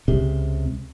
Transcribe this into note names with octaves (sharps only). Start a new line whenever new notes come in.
C#2 C3